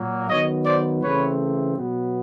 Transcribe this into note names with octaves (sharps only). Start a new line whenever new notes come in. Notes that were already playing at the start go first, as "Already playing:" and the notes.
Already playing: A#2 F#3 A#3
D#3 F#3 B3 C#5 D#5
C5 D5
C#3 E3 A3 C4 B4 C#5
B2 F#3 B3